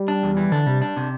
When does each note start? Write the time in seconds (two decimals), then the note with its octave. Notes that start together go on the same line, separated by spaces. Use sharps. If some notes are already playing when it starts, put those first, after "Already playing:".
Already playing: G3
0.08 D4
0.23 E2
0.37 E3
0.52 D3 D4
0.66 C3 G3
0.82 D4
0.97 C3